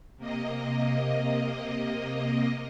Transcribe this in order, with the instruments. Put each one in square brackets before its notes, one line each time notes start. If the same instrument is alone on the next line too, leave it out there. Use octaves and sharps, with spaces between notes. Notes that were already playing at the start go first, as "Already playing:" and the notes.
[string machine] C3 A#3 D#5